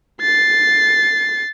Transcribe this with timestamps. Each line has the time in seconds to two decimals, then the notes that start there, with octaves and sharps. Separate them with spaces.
0.21 A6 C7